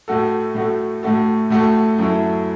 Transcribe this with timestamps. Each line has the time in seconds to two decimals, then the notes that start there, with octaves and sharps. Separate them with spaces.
0.08 A2 A3 F#4 A4
0.55 A2 A3 F#4 A4
1.03 A2 A3 F#4 A4
1.50 A2 A3 F#4 A4
1.98 F#2 F#3 A3 E4 A4